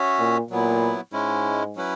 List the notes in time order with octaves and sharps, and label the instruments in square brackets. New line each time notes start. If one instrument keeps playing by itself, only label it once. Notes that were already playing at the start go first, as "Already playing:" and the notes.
Already playing: [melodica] C#4 F#4 C#5 E5
[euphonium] A#2
[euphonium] A#2 [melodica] F#3 B3 E4
[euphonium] G#2 [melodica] G#3 C#4 E4
[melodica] F#3 C#4 E4 B4